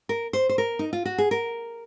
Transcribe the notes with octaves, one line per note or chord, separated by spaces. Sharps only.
A#4
C5
C5
A#4
D#4
F4
F#4
G#4
A#4